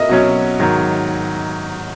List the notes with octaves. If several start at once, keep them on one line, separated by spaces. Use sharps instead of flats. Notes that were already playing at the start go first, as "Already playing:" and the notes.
Already playing: A#4 D#5 E5
B2 F#3 C#4 F#4
G#2 D#3 F#3